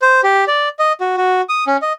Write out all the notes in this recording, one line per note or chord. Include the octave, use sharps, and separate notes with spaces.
C5
G4
D5
D#5
F#4
F#4
D#6
C#4
D#5